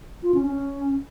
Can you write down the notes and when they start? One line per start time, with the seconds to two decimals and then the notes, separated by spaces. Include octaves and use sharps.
0.23 F4
0.34 C#4
0.46 C#4